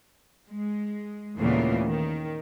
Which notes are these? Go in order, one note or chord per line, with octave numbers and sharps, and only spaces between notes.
G#3
D#2 A#2 C#3 E3 A3 B3
D#3